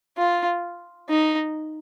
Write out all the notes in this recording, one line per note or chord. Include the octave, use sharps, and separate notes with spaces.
F4
D#4